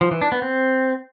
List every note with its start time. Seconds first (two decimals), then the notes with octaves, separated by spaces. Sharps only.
0.01 F3
0.11 E3
0.22 D4
0.32 B3
0.42 C4